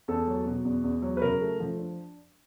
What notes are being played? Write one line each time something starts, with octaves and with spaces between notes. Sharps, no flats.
E2 A4
F#3
B2
E2
E2
F#3
B4
C#3 A#4
A3
F3
D4